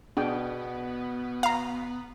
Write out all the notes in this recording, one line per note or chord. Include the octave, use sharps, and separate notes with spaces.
B2 B3 D4 G#4 G5
F5 A#5